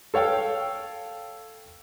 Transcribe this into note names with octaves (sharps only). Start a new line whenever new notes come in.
A4 C#5 F5 G5